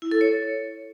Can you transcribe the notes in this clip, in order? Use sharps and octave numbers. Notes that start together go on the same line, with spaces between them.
E4
A4
C#5